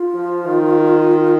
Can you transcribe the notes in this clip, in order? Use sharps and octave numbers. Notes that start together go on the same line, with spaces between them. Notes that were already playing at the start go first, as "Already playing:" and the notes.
Already playing: F4
F3
D#3